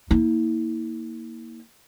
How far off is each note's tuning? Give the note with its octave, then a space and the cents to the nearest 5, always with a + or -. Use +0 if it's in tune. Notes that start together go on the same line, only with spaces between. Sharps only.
A#3 +0 E4 -40